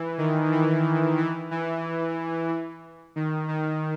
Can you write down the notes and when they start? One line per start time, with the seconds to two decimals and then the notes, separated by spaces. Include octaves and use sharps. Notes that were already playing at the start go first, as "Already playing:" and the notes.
Already playing: E3
0.18 D#3
0.51 E3
1.18 E3
1.51 E3
3.16 D#3
3.48 D#3